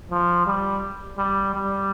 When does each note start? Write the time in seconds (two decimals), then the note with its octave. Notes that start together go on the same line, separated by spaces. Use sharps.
0.11 F3
0.47 G3
1.18 G3
1.54 G3